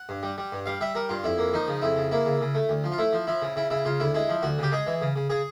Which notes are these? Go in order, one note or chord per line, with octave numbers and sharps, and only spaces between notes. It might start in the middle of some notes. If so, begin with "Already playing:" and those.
Already playing: F#5
G2
G3
G3
G2
G3 F5
G3 E5
G3 A#4
G2 F4
F2 E4
A#3
F3 D#4
C#3
F2 E4
C#3
A#3 E4
C#3
C#3
A3
D2
F3
F4
A3 E4
F3
F3 E4
C#3
C#3 E4
C#3 E4
C#3 F4
D2 E4
G#3 E4
F3
D2 F#4
C#3 G4
G#3 G#4
E3
C#3
C#3
C#3 G#4